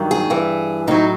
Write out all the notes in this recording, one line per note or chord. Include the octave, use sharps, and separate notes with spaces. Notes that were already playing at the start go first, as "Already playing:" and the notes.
Already playing: G2 D#3 F#3
G#4
G2 E3
A2 F#3 D#4